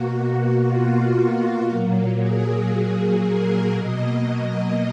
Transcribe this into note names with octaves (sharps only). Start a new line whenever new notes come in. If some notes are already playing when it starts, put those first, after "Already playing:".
Already playing: B2 A#3 F#4
F4
A#2 F#3 A#3
G#4
A#4
B2 F#3 A#3 D#5